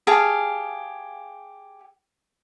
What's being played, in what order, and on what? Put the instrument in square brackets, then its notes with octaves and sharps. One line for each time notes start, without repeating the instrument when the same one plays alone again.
[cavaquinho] G4 G#4 F5 A5